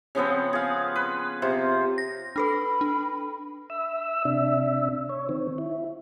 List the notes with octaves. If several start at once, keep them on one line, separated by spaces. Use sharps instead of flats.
C#3 F3 B3 C4
G#4 F5
B4
C3 F4 C5
A#6
D4 A4 B4 B5
D4
E5 E6
C3 D4 E5
C#5
D#3 C4
E4